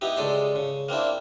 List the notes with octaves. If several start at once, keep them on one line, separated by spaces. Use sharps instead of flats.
B3 D#4 E4 G4
C#2 G#3 A4 D5 C6
C#3
A#3 C4 D4 E4